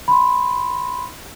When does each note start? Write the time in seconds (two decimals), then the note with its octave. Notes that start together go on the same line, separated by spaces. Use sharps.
0.08 B5 C6